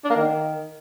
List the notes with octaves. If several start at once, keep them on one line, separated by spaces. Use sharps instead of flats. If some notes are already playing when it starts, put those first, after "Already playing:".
D4
A#3
D#3